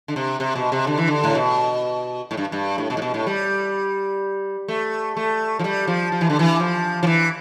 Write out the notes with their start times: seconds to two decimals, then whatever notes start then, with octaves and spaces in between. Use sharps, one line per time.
0.08 D3
0.16 C3
0.40 C3
0.56 B2
0.72 C3
0.87 D3
0.98 E3
1.07 D3
1.24 A2
1.35 B2
2.31 A2
2.37 G2
2.52 G2
2.78 A2
2.90 B2
2.97 A2
3.02 B2
3.14 A2
3.27 G3
4.68 A3
5.17 A3
5.59 F3
5.64 G3
5.87 F3
6.12 F3
6.21 E3
6.30 D3
6.39 E3
6.60 F3
7.03 F3
7.07 E3